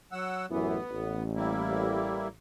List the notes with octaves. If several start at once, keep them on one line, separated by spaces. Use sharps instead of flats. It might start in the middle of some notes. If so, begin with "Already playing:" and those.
F#3 F#5 E6
A1 F#2 E3 B3
A1
G3 A#3 E4